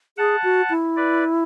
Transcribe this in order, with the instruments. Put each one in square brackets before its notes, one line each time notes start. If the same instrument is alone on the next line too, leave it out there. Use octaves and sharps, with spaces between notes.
[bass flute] G#4 [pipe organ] F#5 A5
[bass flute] F#4
E4
[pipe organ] B4 D5